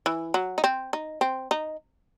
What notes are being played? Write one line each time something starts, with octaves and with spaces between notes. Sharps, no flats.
E3
F#3
D#4
C4
D#4
C4
D#4